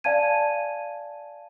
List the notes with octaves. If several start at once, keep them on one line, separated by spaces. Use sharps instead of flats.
D5 F5 G#5 A5 G#6 D#7